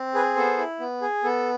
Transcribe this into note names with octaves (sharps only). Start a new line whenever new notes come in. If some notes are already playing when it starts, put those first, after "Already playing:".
Already playing: C4
G#4 B4
B3 A4 C5
E4
B3
G#4
B3 A4